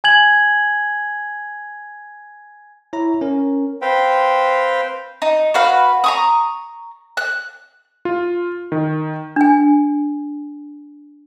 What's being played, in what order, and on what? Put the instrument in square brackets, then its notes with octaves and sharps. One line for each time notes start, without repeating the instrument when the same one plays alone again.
[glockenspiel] G#5 G#6 F#7
[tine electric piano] E4 C#5 A#5
C#4 A#4
[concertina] C4 B4 C5 F5 G5
[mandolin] D#4
F#4 B4 F5
A#5 C#6 D#6
F#6
[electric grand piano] F4
D#3
[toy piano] D4 G#5